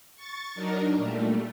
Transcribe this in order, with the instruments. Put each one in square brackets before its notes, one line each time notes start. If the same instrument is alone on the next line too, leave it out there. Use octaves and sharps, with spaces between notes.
[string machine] C#6 A6
F#3 D4 D#4 A#4
A#2 G3 A3